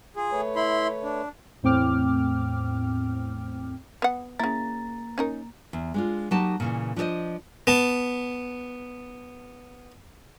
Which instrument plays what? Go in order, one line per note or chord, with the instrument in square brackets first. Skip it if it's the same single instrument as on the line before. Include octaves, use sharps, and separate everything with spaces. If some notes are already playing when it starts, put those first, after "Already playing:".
[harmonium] F4 [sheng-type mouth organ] G#4
[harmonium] A3 B4 C#5
[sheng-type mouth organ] E4 B5 C6
D4
[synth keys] E2 A2 C4 G5 D6 F6
[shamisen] B3 F#5
[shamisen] C#3 E4 [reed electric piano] A#3 A#5 A6
[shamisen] C#4 D#4 A#4
[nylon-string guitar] E2
G#3 D4 F4
F#3 A#3 D#4 G4 A5
A#2 C#3 E3
F3 D4 D#4 G#4 C5 D#5
[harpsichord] B3 A5